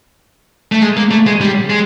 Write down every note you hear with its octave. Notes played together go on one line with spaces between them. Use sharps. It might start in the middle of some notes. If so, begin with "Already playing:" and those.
A3
G#3
A#3
A3
G#3
G3
G#3